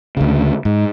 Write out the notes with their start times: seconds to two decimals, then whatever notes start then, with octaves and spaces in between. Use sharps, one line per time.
0.17 D2 C#3
0.65 G#2